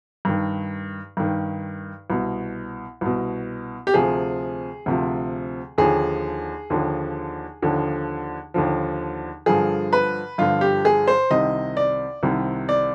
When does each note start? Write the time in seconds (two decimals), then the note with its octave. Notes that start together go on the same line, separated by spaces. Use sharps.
0.25 G2 D#3
1.17 G2 D#3
2.10 C2 B2
3.01 C2 B2
3.87 G4
3.94 D2 C3 F3 G#4
4.86 D2 C3 F3
5.78 D#2 D3 F3 G#4
6.70 D#2 D3 F3
7.62 D#2 D3 F3
8.54 D#2 D3 F3
9.46 G2 D3 F3 G#4
9.93 B4
10.38 G2 D3 F3 F4
10.61 G4
10.85 G#4
11.07 C5
11.30 C2 C3 D#3 D#5
11.77 D5
12.23 C2 C3 D#3
12.69 D5